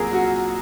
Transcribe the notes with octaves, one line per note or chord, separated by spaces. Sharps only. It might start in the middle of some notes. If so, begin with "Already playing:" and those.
Already playing: C2 A#2 F#3 G#4 A#4
F#4